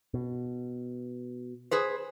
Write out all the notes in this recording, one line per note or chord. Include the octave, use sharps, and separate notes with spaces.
B2
G#4 B4 C5